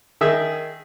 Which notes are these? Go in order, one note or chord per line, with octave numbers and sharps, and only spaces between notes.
D#3 G#4 E5